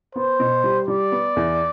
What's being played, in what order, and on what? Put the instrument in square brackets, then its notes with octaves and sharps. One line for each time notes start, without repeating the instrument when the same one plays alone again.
[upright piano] B3 [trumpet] C5
[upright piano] B2
G3
[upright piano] G3 [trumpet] D5
[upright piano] B3
E2